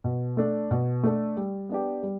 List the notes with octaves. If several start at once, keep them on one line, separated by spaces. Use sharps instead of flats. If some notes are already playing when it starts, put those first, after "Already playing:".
B2
A3 D4 A4
B2
A3 D4 A4
G3
B3 D4 G4
G3